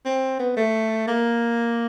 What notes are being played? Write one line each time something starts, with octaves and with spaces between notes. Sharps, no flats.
C4
B3
A3
A#3